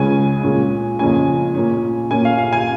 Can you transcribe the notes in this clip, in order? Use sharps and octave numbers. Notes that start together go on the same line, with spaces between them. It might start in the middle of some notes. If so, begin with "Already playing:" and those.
Already playing: C#2 C#3 G#3 C#4 G#5
A#2 G#3 C#4
F2 C#3 A#3 C#4 G#5
A#2 A#3 C#4
A#2 A#3 C#4 G#5
F5
F5
G#5